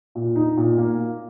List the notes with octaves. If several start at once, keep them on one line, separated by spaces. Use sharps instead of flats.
A#2
D#4
A#2
A#3